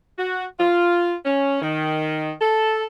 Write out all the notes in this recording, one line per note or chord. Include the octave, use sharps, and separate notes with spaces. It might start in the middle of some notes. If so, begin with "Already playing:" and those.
F#4
F4
C#4
D#3
A4